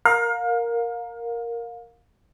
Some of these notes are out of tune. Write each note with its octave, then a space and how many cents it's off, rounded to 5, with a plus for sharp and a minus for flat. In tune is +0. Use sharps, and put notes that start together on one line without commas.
A#4 +0 F5 +30